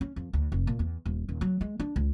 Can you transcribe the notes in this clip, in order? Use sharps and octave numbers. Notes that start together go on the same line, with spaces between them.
C#4
F2
D2
F1
A#2
E2
D#1
D#1
F#3
G#3
D4
C#2